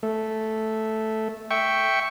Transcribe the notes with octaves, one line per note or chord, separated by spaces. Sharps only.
A3
E5 G5 C#6